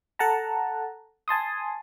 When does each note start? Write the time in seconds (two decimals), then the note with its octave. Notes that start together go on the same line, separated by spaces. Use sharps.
0.19 A4 F#5 A5 A#5
1.28 G#5 A5 C6 D#6